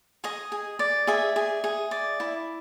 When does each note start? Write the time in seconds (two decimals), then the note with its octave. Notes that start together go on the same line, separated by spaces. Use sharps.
0.24 G#4 D#5
0.52 G#4
0.79 D5
1.07 G#4 E5
1.36 G#4
1.64 G#4
1.91 D5
2.20 E4